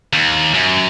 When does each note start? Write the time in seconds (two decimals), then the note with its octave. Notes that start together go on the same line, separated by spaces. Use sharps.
0.13 D#2
0.54 F#2